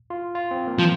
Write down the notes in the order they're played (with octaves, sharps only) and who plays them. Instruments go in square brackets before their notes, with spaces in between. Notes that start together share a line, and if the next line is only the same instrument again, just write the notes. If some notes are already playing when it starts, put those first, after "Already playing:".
[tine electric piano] F4
F4
C4
A#3
[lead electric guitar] F3